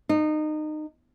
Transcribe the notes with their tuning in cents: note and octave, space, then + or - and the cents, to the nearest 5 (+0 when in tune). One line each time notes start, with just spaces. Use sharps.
D#4 -25